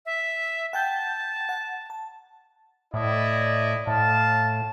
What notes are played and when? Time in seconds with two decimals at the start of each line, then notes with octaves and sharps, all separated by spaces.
0.06 E5
0.73 F#5 G5 A5 G6
1.49 F#5
1.90 A5
2.94 A2 E4 D5 D#5
3.87 A2 F5 A5